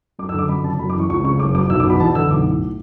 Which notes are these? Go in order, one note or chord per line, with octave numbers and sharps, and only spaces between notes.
F#2 D6
E6
D3 D6
F#2 B5
C#3 A5
F#2 B5
D6
E3 C#6
C#2 C#6
C#3 C#6
F#1 D6
F#2 D6
B1 E6
D6
B2
B5
E2 A5
D3 E6
B1 D6
A2